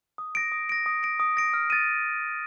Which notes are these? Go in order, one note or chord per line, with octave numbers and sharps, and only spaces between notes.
D#6
A#6 D7
D#6
A#6 D7
D#6
A#6 D7
D#6
A#6 D7
F6
A6 D#7